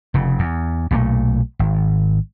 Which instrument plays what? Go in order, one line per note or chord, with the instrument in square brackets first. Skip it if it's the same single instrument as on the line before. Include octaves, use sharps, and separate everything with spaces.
[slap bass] F1 C#3
E2
B1 A#2 F#3 A3
G#1